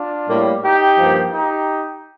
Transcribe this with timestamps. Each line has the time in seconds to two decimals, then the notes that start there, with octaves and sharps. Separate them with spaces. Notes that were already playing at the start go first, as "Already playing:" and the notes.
Already playing: D4 F4
0.27 A2 G3 A#3
0.63 D#4 G4
0.99 G2 F3 A#3
1.33 D#4 G4